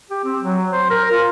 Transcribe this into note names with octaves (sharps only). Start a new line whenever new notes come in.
G4
C4
F#3
C5
A#4
F4